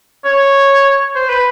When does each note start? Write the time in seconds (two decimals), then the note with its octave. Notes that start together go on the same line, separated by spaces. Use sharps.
0.25 C#5
1.15 C5
1.29 B4